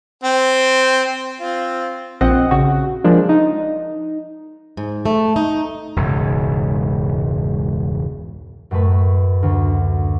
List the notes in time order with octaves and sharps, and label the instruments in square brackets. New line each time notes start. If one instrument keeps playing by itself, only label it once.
[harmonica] C4 G5
C4 F4
[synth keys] A#1 C4 D#5 F#5
C#3 F#4
F3 G#3 A#3 D4
D#4
[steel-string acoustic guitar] G#2
A3
D#4
[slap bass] E1 C#2 G#2
[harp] F#2 A2 A3 B4 B6
D2